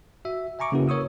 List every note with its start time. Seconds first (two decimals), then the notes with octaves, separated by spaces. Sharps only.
0.25 F#4 E5
0.59 E5 G#5 A#5 C#6 D6
0.72 C#3 A#3 C#4 E4 F#4 B4
0.88 A#4 C#5 C#6 D#6 E6